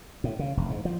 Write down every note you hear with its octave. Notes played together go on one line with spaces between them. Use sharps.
A2
C#3
F1
G#2
F3